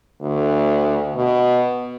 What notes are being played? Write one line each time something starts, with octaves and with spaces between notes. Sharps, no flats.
D2
B2